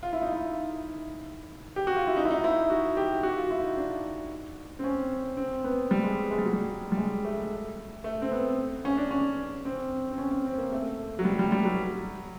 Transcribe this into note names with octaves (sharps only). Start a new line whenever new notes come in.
F4
E4
D#4
E4
G4
F#4
F4
E4
D#4
E4
D#4
E4
F#4
G4
F#4
F4
E4
D#4
D4
C4
C#4
C4
B3
G3
G#3
G#3
G3
F#3
G3
G3
G#3
A3
A3
C4
B3
C#4
D4
C#4
C4
C4
C#4
C#4
C4
A#3
A3
F#3
G3
G3
G3
F#3